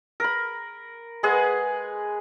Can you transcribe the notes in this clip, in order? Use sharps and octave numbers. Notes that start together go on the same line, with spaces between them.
A#4 B5
G#3 G#4 B4 F#5